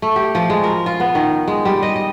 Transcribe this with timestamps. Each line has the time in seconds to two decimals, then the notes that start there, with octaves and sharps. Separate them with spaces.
0.02 A3
0.16 G4
0.35 F3
0.50 G#3
0.63 A#4
0.86 F4
1.00 B3
1.15 D#3
1.48 G#3
1.65 G3
1.83 D#5
1.96 D#5